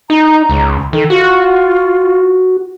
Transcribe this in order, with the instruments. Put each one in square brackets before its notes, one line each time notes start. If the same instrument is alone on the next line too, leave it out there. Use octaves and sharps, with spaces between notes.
[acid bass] D#4 [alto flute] A#5
[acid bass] C#2
[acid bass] D#3 [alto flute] A4
[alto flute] F4 [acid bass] F#4